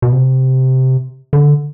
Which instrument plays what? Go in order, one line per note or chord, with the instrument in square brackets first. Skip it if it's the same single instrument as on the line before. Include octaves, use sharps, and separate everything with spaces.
[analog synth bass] B2
C3
D3